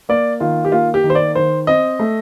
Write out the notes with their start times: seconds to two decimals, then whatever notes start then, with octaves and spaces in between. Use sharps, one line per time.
0.09 A#3 D5
0.40 D#3 F4
0.65 G4
0.72 A#3 F4
0.94 G4
1.04 D#3
1.10 C5
1.15 D5
1.35 D#3 C5
1.67 C4 D#5
1.99 A3